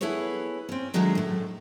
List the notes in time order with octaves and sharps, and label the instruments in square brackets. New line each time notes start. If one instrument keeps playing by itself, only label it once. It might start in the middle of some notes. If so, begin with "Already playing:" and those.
[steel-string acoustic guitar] B3 E4 G#4 A4 B4 C#5
C4 C#4
D#3 F#3 G#3 A3 C#4 D4
A2 A3